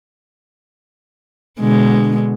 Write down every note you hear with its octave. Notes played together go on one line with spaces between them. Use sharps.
B2 D3 G#3